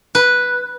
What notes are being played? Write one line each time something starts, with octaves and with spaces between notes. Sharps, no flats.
B4